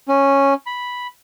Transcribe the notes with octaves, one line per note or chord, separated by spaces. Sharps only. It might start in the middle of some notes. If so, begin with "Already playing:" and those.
C#4
B5